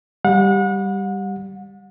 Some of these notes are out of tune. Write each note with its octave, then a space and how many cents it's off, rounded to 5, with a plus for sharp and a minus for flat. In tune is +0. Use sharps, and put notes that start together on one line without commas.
G3 +0 F#5 -35